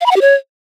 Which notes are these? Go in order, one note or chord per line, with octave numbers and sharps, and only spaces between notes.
F5
B5
F#5
G4
C#5